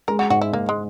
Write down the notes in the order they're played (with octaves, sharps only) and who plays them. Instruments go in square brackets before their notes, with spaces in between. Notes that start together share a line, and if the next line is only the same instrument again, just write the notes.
[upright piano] G#3 [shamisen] A#4
[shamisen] F#4
[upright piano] G#2 [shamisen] F#4
[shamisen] E4
[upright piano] G#2 [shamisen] A#3
[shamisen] G#3